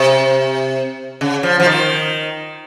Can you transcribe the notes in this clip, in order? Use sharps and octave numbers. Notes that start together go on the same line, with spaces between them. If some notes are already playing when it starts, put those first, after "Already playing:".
Already playing: C3
C#3
F3
F3
D#3